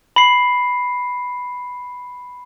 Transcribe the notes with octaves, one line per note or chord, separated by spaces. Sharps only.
B5 C7